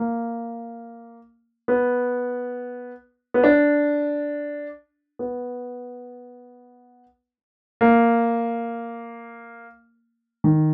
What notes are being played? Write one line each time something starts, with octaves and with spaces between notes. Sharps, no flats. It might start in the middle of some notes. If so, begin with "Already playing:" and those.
Already playing: A#3
B3
B3
D4
B3
A#3
D#3